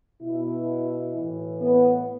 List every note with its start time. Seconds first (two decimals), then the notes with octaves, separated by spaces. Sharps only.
0.21 B2 E4
1.14 A2 E3
1.61 B3